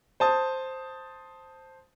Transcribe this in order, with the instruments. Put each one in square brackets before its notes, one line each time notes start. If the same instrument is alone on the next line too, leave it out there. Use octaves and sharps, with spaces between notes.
[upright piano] C5 A5 D#6